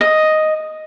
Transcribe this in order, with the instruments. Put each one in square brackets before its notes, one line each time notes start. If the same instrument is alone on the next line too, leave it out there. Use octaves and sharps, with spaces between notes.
[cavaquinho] D#5